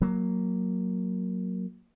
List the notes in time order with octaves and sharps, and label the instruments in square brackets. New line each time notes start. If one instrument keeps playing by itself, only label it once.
[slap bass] F#3 A#3